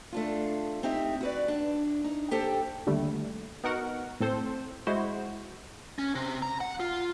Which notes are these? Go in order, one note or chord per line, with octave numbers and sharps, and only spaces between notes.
A3 D4 F4
C4 D#4 G4 E5
F#4 B4 D5
D4
D#4
A#2 G4 A4 C5 G5
D#2 D3 G3 A3
B3 D#4 F#4 A#4 F#5
A2 C4 A4 C5
G#3 E4 F#4 C5
C#4
C3
A#5
F#5
F4